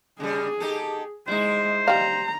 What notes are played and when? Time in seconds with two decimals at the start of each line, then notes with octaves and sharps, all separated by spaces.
0.20 C#3 G3 G#4
0.60 D#4 G4 A4
1.27 G#3 D#4 E4 C5
1.88 G3 F5 A#5